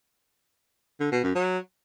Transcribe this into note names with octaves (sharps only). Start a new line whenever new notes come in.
D3
B2
F#2
F#3